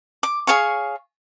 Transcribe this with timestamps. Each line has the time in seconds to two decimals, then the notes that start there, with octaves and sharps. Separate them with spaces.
0.23 D6
0.47 G#4 C#5 F5 C#6